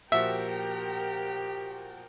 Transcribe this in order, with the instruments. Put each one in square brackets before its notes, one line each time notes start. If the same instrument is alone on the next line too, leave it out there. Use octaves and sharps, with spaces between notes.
[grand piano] A#2 F3 F#4 [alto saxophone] G4 [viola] A#4 G5 [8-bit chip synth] E5